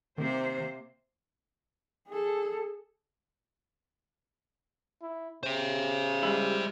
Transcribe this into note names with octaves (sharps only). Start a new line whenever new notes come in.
C3 D#3 A#3 C5
G#4 A4
E4
C#3 C5 E5
G3 G#3 E4